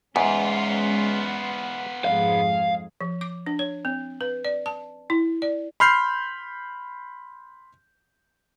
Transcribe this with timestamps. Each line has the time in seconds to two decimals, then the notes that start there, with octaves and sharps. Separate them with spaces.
0.16 E2 G#2 G#3 B3 C#4 F4
2.05 F2 G#2 G#4 F5
3.01 F3
3.21 D6
3.46 D4
3.59 C#5
3.85 C4
4.21 B4
4.45 D5
4.66 A5
5.10 E4
5.42 D5
5.80 B5 C6 F6 G6 C7